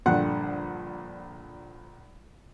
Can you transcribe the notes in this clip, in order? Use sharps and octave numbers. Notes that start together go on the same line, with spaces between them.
A#1 G2 D3 F#5